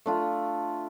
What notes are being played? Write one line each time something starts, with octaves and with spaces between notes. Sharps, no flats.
A3 D4 F4